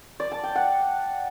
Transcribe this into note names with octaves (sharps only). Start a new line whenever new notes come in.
D5
A5
G5
F#5